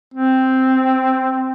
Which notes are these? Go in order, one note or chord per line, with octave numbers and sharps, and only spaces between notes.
C4